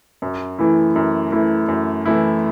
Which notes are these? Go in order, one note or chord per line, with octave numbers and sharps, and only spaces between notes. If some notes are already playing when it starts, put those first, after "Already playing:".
F#2
E3 A3 E4
F#2
E3 A3 E4
F#2
E3 A3 E4